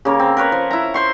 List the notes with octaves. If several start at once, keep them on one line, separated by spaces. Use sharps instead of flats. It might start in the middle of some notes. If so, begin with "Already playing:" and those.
C#3 A#3 C#5
C4
A#4 B4 C#5
F3
E4 A#5
C5 C6 C#6